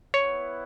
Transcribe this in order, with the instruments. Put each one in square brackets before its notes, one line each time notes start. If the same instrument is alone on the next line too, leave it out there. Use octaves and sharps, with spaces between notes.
[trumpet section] B3 E4 B4 F#5 [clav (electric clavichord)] C#5